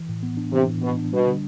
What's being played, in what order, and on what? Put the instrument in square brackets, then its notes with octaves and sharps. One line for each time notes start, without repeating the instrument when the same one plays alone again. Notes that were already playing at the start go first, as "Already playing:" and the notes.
Already playing: [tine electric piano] E3
A2
B3
D4
[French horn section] C3 [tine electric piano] E3
[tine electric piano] A2
[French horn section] B2 [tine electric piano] B3
[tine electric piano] D4
[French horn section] B2 [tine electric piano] G3
[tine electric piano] D3